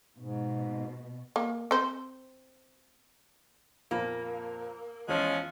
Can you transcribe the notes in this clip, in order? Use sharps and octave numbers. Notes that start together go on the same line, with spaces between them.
G#2 B2
A#3
C4 C5
F2 A#2 A#3
E2 F3 G#3 C#4